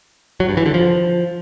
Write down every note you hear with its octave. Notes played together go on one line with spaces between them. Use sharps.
F#3
G2
E3
D3
F3